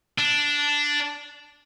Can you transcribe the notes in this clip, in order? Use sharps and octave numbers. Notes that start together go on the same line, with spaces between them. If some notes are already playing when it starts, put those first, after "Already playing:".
D4